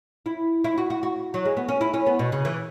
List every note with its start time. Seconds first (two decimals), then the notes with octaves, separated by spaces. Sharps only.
0.26 E4
0.64 E4
0.78 F#4
0.90 F#4
1.03 F#4
1.34 F#3
1.45 G#3
1.57 B3
1.68 C#4
1.81 E4
1.94 C#4
2.06 B3
2.19 B2
2.32 C#3
2.45 E3